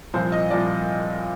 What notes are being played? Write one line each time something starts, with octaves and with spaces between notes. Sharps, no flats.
C2 A#2 F3 C5
D#5
C2 A#2 F3 D5